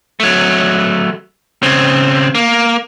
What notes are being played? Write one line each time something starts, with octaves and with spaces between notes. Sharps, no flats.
F#3 A3
C#3 C4
A#3